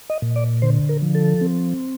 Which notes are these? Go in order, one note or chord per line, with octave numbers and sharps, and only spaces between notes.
D#5
A#2
D5
D3 C5
A#4
F3
A4
C4